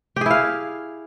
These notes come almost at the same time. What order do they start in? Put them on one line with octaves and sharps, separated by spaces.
G4 G#4 E4 F5